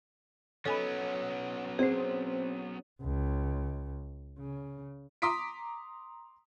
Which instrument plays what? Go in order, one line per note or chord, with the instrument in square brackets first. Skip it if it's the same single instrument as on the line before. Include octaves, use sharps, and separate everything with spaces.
[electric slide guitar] F#3 B3 [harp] C#4 [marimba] A4 G#5 B5
[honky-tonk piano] C4 [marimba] G#4 C5
[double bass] C#2
C#3
[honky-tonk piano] A#5 C6 D6 D#6 B6 D7